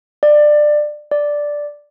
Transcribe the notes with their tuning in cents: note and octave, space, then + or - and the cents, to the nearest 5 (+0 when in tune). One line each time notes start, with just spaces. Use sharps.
D5 +20
D5 +0